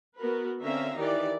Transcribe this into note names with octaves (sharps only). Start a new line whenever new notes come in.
B3 F#4 A#4 B4
D3 C4 C#4 E5 F5 A#5
D#3 E3 D#4 G4 D5